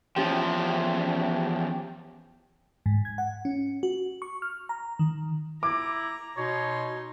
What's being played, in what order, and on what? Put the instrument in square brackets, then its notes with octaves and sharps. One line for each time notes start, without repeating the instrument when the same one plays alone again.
[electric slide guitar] E2 A#2 F3 [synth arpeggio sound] C#4 G4 G5
[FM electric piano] G#2
G#6
F#5
C#4
F#4
C#6
F6
A#5
D#3
[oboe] E4 [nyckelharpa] A#5 [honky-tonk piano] D6
[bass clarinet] B2 [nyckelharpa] D#4 C6 [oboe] C#5